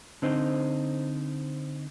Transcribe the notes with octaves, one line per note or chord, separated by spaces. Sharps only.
D3 C4 D#4 C5